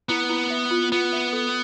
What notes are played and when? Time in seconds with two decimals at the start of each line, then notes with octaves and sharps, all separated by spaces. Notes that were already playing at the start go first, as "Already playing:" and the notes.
0.09 B3 E4
0.30 E4
0.50 E5
0.71 F4
0.92 B3 F4
1.13 E5
1.33 A4